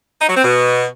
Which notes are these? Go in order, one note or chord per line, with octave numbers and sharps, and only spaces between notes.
D#4
F#3
C4
B2